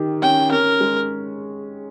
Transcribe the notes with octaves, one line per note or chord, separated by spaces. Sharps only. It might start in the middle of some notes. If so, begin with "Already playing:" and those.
Already playing: D#3 G4
C#4 G5
C#4 A#4
G#3